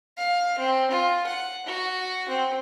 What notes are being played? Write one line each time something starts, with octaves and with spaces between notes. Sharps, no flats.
F5
C4
F4
F#5
F#4
C4